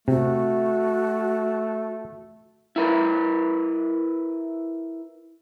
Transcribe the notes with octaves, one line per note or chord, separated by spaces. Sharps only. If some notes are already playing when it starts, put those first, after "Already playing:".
C3 A3 F#4
E4 A#4 B4